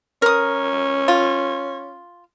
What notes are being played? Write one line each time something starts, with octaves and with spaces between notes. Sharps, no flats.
C#4 A#4 D#6
F4